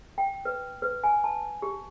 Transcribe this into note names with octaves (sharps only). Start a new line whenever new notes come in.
G5
B4
B4
G#5
A5
G4